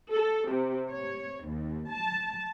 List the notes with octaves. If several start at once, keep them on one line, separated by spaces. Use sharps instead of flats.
A4
C3
C#5
D#2
A5